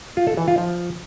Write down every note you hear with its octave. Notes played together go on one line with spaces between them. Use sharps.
F4
A4
E3
F4
F3